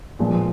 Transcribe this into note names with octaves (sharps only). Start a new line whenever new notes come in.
A#2 F3 G#3 B3